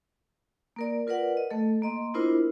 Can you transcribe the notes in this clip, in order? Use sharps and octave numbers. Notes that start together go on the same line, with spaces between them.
A#3 A#4 D5
F4 A#4 B4 D5 F#5
D#5
A3 A4
A#3 D#5 C6
B3 D4 E4 F4 A#4 C5